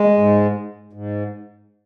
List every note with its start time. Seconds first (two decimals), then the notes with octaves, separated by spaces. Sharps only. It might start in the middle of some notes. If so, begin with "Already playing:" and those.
Already playing: G#3
0.17 G#2
0.93 G#2